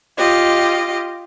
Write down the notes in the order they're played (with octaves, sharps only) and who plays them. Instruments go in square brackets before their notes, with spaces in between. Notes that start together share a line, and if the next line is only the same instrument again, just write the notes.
[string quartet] F4 G4 D#5